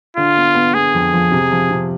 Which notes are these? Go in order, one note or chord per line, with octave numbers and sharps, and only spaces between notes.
D3 F4
B3
B3
B3 G#4
F2
F3
C3
F3
C3